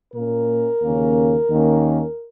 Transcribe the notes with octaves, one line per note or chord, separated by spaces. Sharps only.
A#2 A#3 C#4 A#4
D#2 C#3 A#3 C#4
D#2 D#3 A#3 C#4